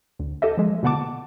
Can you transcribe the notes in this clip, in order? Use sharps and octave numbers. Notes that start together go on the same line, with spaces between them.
D2
G4 A4 D#5 E5
F3 G#3
B2 D3 B3 F#5 A5 D6